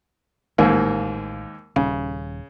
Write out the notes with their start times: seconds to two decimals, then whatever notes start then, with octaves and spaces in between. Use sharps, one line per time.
0.58 A1 D#2 G#2 A#3
1.76 D#1 C#3